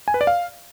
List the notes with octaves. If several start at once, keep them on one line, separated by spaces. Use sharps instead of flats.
G#5
B4
D5
F5